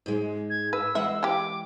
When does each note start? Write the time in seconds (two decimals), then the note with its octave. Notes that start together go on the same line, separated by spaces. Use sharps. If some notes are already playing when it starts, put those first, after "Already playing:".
0.06 G#2 G#3
0.50 G#6
0.73 B4 E6
0.95 E3 G#3 E5 F#5
1.23 E4 G4 D6